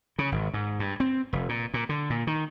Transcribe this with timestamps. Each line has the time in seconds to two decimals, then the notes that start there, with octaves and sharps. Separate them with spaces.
0.19 C#3
0.32 G#1
0.54 G#2
0.80 G2
1.00 C4
1.33 F1
1.49 A#2
1.74 A#2
1.89 D3
2.10 A#2
2.27 D#3